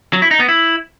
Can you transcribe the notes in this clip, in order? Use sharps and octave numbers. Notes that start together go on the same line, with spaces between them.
F#3
E4
D#4
B3
E4